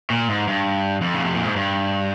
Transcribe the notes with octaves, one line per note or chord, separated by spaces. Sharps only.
A#2
G#2
G2
F2
C#3
C3
A#2
G#2
G2